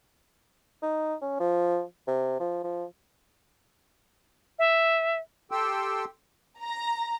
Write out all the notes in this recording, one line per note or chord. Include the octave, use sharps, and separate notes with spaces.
D#4
C#4
F3
C3
F3
F3
E5
G4 A4 G5 C6 E6
A#5